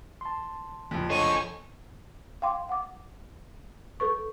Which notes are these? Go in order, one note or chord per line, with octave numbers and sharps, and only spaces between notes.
A5 C6
F#1 F2
C2 D3 A4 C5 C#5 D#5 G#5
F5 G5 C6 D6
F#5 D6
A4 B4 C#6